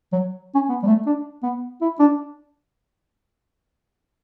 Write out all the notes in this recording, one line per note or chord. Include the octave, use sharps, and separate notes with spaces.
F#3
C#4
B3
G3
A3
D4
B3
E4
D4